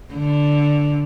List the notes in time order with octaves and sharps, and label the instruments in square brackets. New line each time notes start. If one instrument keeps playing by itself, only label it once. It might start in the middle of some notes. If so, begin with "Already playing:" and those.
[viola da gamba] D3